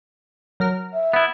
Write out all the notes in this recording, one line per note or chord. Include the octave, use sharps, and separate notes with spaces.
F#3 A#4 F6
E5
B3 E4